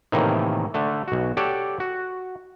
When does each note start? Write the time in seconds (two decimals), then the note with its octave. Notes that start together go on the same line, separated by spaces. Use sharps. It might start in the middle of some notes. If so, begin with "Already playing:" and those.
0.12 A2 C3 D#3 E3 A#3 D#4
0.74 D3 A3
1.08 B1 F#4
1.37 G4 A4 C#5 D5 F#5
1.80 F#4